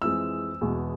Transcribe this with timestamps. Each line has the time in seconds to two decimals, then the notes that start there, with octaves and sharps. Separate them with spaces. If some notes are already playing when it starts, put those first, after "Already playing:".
0.01 F2 E3 G#3 E6
0.61 E2 B2 G#3